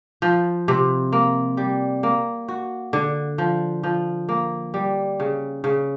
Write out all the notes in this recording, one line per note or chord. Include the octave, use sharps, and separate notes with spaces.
F3
C3
A#3
G3
A#3
F#4
D3
F3
F3
A#3
G3
C#3
C#3